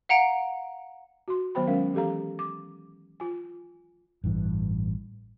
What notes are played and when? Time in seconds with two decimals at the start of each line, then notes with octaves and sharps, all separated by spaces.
0.09 F5 F#5 A#5 D7
1.28 F#4 C6
1.55 D#3 F#3 B3 C5 G5 B5
1.67 F#3 G#3 C#4 A#4 F5
1.94 E3 G4 A4 F5 A#5
2.39 D6
3.20 F4 G#5
4.24 A1 G2 E3